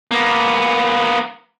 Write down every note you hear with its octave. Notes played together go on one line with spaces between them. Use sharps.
A#3 B3